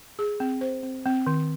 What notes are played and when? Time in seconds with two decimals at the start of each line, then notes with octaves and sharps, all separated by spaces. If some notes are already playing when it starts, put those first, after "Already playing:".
0.19 G#4
0.40 C4
0.61 C5
0.83 C4
1.06 C4
1.27 D#3